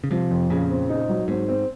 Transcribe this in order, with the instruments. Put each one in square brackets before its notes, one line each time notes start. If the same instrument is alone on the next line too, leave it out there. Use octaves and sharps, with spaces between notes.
[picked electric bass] C#3
[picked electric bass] C3 [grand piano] F3
[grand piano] F2
[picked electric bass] A#2 [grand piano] C#3
[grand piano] C4
D#4
F#3
[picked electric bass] G#2 [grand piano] C4
[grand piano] C4